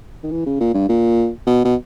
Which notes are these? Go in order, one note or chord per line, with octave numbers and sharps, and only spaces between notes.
D#3
E3
C#3
A#2
G2
A#2
B2
B2